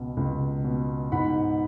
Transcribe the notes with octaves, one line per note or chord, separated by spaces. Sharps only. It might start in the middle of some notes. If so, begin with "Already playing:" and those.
Already playing: C#2 B2
C#2
B2
G#2 F#5 B5